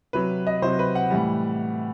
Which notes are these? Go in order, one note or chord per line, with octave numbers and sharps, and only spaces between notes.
C3 F#3 B4
D#5
C3 F#3 C5
B4
F#5
A2 E3 G3